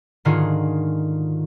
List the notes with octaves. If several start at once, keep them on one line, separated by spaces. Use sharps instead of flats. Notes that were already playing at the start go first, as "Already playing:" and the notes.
G#2 D3 D#3 F4 F#4 G#4